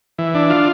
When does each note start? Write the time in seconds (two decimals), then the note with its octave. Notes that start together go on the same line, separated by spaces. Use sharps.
0.18 E3
0.34 D4
0.50 F4